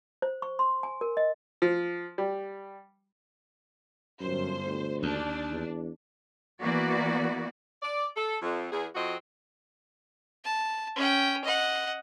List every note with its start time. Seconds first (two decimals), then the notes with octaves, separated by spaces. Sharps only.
0.22 C5
0.42 C#6
0.59 C6
0.83 G#5
1.01 A#4
1.17 D#5
1.62 F3
2.18 G3
4.20 G1 F#2 C5
4.66 D2
5.03 D#2 D4
5.51 E2
6.62 E3 A#3 B3 F#4 D5
7.82 D5
8.16 A4
8.42 F2
8.71 E2 G#4
8.94 F2 C4 F#4 D#5
10.45 A5
10.96 C#4 G5
11.44 D#5 F#5